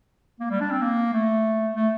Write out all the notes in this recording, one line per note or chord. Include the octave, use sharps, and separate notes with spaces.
A#3
G3
D4
C4
A#3
A3
A3